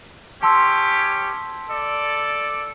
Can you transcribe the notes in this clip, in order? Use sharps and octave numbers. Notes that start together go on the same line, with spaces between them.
C#4 G4 A5 C6 E6
A4 D5